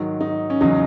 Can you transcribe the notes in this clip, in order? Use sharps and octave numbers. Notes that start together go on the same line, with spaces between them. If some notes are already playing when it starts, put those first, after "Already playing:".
Already playing: G#2 D#3 F#3
D#4
C#4
E2 C#3 F#3 D#4